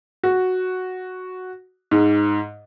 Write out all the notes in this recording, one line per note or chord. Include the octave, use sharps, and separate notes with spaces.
F#4
G#2